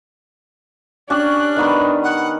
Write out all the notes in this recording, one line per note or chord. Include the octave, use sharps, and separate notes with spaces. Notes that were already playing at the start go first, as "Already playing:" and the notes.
C#4 D4 G4 F#6
D#3 B3 B4
F#5